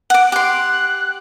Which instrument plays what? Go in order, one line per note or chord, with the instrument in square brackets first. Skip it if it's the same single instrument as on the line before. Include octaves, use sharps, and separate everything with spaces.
[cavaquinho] F#5 D6
[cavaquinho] G4 C6 [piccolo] F#6